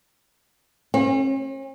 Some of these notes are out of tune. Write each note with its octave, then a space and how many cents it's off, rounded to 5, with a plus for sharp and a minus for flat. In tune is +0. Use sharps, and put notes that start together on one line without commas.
C#4 -45